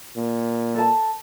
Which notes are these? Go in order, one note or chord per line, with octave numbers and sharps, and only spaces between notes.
A#2
A4 A5